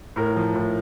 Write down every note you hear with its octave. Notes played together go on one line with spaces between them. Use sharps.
A2 A#4
F3
A2